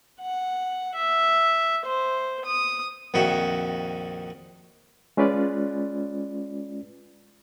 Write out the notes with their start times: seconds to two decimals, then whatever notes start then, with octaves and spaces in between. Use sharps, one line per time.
0.21 F#5
0.95 E5
1.86 C5
2.45 D#6
3.14 A#1 F2 D#3 F#4 E5
5.17 G#3 C#4 F4 B4 D5